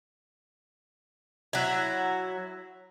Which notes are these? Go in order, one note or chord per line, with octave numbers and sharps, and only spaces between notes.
F#3 E4